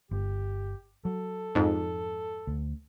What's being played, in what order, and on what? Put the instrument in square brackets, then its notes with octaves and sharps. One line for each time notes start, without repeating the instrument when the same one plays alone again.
[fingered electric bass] G1 [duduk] G4
[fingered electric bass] F#3 [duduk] A4
[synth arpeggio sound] F2 G#2
[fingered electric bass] D2